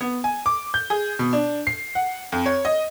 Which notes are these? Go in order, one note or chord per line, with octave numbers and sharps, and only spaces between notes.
B3
G#5
D6
G6
G#4
B2
D4
C7
F#5
F2
C#5
D#5